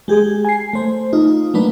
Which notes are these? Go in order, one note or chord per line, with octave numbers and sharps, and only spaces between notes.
G#3 G4 G#4
G#5 C7
A3 C5
A3 D#4 F4
F#3 A3 A#3 D4 B4